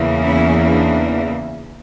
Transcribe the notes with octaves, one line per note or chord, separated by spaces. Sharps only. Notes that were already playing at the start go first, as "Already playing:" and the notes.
Already playing: E2 C#3 E3 A#3
C#4 E4
D4